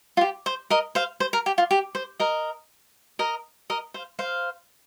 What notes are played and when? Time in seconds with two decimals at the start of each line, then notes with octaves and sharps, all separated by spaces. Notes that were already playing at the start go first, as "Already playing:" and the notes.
0.17 F4
0.21 G4
0.46 C5
0.70 A#4 D#5
0.95 C5 F5
1.20 C5
1.33 A#4
1.46 G4
1.58 F4
1.71 G4
1.95 C5
2.20 A#4 D#5
3.19 A#4 D#5
3.70 A#4 D#5
3.94 C5 F5
4.19 C5 F5